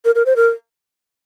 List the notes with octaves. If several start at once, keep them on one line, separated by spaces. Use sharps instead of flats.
A#4
A#4
C5
A#4